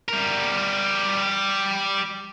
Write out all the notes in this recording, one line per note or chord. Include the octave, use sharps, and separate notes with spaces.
G3 A#4